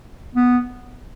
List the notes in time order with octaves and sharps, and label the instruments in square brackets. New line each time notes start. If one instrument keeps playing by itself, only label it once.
[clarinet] B3